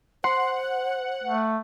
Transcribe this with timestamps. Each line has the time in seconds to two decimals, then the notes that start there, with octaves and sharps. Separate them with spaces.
0.24 C5 F#5 C6
1.24 A3